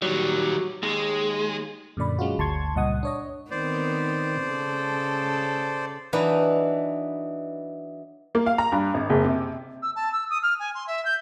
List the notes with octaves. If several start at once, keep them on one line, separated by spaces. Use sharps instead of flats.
D#3 F#3 G3
D#2 G#3
F#2 A#2 D3 D5 B5
F#3 G#3 C#4 F4 F#4
G1 D2 A5 C6 C#6 G#6
C#2 G2 A#2 D#5 F#5 D#6
D4 C#5 D#5
D#3 B3 C4 C5 D5
C#3 A4
E3 F#3 D4 D#4 B4
A#3
F5
A#5
G2
G#1
F#1
C3
E6
A5
E6
D#6
F6
G#5
C6
E5
G6